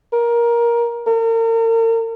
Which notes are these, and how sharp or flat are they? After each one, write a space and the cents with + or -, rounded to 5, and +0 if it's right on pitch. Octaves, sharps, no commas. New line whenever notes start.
A#4 +15
A#4 -40